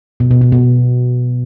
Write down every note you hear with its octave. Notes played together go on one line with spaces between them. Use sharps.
B2
B2
B2
B2